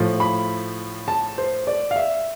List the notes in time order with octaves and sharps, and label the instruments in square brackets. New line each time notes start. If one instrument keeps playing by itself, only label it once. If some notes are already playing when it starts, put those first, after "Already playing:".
Already playing: [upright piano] A2 F3
B5
A5
C5
D5
F5
E5